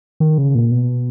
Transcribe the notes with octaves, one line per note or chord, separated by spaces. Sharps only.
D#3
C#3
A#2
B2